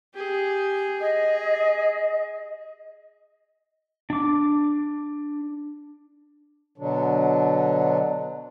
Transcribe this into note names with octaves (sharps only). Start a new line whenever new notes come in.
G4 G#4
G#4 D#5
D4 D6
B2 D3 F#3 D4